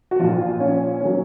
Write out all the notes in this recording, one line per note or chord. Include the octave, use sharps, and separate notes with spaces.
F#4
A#1 A#2 F3 F4
C#4
D#3 F#3 C#4